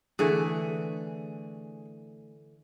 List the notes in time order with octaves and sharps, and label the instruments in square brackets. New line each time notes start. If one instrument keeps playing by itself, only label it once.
[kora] D3 E3 A3 [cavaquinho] G#4